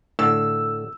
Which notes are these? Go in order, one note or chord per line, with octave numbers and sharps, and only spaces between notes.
A2 D3 E6